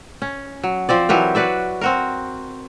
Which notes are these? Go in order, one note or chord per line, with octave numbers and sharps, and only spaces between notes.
C#4
F#3
F3 C4 D5
E3 F#3 G4 A#4
F#4 B4 D5 E5
C4 F#4 A#4